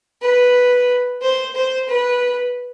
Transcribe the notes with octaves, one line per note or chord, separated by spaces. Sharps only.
B4
C5
C5
B4